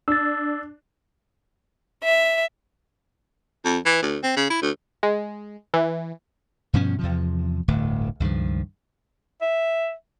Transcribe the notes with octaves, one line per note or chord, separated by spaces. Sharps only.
D4 E6 A6
E5
F2
E3
D2
C4
C#3
E4
D2
G#3
E3
G2 B2 F3 C#4
E2 C3 F3
D1 G1 D2 A2
C#2 G2 D#3 F3
E5